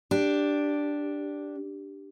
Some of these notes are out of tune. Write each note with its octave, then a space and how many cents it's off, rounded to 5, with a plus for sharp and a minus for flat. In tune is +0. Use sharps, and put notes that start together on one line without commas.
D4 +0 G4 +0